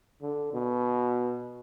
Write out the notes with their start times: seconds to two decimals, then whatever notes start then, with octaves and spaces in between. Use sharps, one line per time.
0.22 D3
0.53 B2